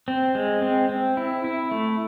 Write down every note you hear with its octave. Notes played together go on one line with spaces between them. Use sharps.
C4
G#3
C4
C4
E4
E4
A3